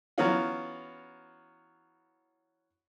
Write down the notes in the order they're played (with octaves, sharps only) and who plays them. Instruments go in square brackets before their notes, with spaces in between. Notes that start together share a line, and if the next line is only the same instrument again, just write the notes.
[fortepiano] E3 F#3 B3 C#4 F4